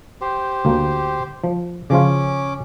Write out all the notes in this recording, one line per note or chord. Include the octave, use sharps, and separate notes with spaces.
G4 C5
D2 A#3
F3
C#3 F3 C#4 F4 D6